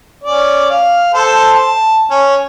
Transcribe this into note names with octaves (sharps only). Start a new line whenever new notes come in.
C#4 D5
F5
A4 C5 A5
A5
C#4